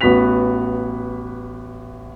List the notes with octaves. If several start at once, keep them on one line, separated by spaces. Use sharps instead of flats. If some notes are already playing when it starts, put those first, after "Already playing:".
A1 B3 F#4 B5 B6 F7